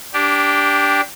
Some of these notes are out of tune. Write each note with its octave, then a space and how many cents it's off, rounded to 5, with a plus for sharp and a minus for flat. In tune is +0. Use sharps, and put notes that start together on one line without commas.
D4 -15 G4 +0